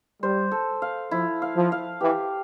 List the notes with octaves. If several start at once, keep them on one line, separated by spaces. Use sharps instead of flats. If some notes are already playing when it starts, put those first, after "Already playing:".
G3 C5
A4
F5
F3 E4
F5
F3
F5
E3 G4